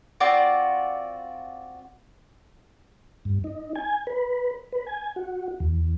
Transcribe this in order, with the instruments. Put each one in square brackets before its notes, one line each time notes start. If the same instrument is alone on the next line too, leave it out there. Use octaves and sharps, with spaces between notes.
[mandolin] C4 F4 F#4 D5
[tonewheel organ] G2
D#4
G#5
B4
B4
G#5
F#4
E2